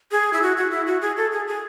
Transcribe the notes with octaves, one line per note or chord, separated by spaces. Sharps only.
G#4
E4
F#4
F#4
E4
F#4
G#4
A4
G#4
G#4